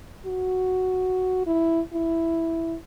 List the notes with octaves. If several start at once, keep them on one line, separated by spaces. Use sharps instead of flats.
F#4
E4
E4